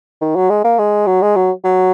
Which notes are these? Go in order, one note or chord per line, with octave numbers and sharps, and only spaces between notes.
D#3
F#3
G#3
A#3
G#3
F#3
G#3
F#3
F#3